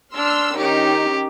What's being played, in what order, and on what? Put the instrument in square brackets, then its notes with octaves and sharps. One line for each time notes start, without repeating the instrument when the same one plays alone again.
[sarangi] D4 [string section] C6 E6 F6
[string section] D#3 C#4 D#4 [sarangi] G4